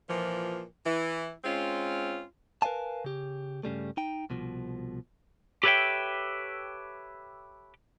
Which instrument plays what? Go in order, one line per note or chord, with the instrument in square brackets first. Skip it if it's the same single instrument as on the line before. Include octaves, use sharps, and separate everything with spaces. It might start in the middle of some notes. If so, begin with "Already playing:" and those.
[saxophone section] A#2 E3 F3
E3 E4
G#3 C4 C#4 F4
[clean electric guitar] A#4 B4 D#5 F5 G#5 A5
C#3 G4
G2 C#3 G3 A3
D#4 G5
C2 B2 F3
G4 A4 B4 C#5 E5 G5